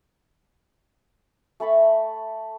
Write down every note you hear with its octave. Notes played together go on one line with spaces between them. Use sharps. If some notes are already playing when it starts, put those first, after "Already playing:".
A3 A5 B5 C#6